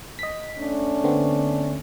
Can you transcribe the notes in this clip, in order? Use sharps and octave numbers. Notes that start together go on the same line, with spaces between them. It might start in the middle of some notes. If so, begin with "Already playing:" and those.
D#5 B6
A3 C#4 D4
D3 B3 C4